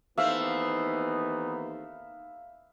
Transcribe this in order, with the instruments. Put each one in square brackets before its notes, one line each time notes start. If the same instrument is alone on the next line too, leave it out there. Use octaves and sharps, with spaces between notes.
[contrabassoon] D#2 [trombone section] E3 B3 D#4 [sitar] A3 C4 [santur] E5 F5